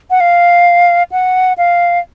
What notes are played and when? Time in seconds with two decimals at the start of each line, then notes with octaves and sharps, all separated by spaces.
0.10 F#5
0.20 F5
1.12 F#5
1.58 F5